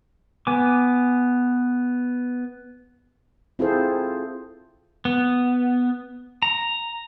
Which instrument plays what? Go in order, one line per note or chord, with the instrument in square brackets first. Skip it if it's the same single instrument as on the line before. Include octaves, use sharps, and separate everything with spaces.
[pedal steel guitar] B3 G#5 D6
[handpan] C4 E4 F4 G#4 A4 C5
[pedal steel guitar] B3
A#5